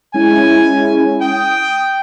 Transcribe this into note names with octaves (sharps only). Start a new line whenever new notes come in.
G#3 C#4 E4 G#5
G5 D#6